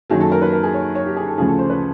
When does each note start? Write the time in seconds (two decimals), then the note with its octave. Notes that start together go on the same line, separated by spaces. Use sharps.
0.10 F#2 D#3 F#3 A#3 G#4
0.21 A4
0.32 A#4
0.42 B4
0.53 A#4
0.63 G#4
0.74 C#5
0.95 C#5
1.06 G4
1.16 G#4
1.27 A4
1.38 D2 C#3 F3 G#4
1.48 A4
1.59 C5
1.70 B4